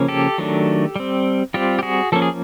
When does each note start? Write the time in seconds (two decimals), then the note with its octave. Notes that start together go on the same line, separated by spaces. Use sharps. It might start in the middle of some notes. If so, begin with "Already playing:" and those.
Already playing: C#3 F3 A#3 C#4
0.08 G4 A4
0.38 D#3 F#3 A3 D4
0.96 G3 C4
1.54 G3 C4 F4 G4
1.79 G4
1.83 F#4 G#4
2.12 F3 A#3 C#4 A4
2.22 G#4